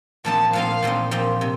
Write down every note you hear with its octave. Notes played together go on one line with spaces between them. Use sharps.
A#2 F3 C4 D#4 A5
A#2 F3 C4 D#4 F5
A#2 F3 C4 D#4
A#2 F3 C4 D#4
C3